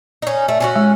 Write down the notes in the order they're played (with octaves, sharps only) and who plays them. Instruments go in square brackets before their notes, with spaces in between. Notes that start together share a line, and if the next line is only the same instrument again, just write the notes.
[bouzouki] C#4 D#4
A3
C#4 F4 F#4
[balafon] G#3